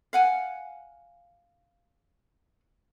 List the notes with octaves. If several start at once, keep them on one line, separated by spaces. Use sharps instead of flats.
F5 F#5 G#5